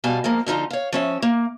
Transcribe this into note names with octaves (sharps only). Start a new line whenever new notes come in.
B2 G3 F5 G#5 A5
F3 G#3 A#3
D3 F3 D#4 F4
C#5 F5
F3 C#4 E5
A#3